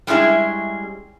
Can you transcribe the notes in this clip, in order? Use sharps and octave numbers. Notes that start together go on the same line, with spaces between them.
G3 G#3 C#4 E4 G#4